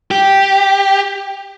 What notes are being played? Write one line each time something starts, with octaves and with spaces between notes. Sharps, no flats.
G4